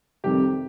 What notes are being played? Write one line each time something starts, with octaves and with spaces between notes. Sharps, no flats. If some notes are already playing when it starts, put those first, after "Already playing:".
F2 C3 D#3 G3 G4